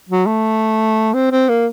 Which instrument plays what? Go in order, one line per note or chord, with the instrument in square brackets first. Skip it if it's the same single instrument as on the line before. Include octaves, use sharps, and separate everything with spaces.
[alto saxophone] F#3
A3
C4
C4
A#3